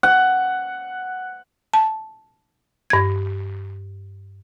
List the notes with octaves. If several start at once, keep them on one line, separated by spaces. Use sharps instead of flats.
F#5
A5
G2 G#6